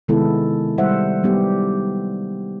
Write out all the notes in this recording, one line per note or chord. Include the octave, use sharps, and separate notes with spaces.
C3 D#3 G#3 B3 E4 A4
G3 G#3 C5 E5 F#5
F#3 G3 B3 D#4 G4